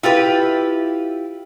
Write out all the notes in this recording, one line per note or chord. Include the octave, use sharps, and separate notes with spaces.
E4 F4 G4 B4